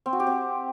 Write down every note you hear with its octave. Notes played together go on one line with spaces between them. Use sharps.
C4
F#4
G4
C4